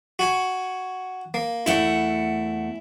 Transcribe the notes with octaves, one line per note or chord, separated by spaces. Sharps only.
F#4 G#5
A#3
E2 A3 E4 F#5